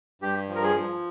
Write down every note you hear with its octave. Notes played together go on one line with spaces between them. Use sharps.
G2 G4
F3
A#4
G#4
F3